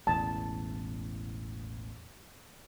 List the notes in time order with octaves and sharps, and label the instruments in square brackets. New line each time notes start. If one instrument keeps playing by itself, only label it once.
[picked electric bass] E1 A1 E2 [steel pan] A5